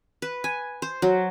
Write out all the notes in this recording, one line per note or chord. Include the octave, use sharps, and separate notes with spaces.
B4
G#5
C5
F#3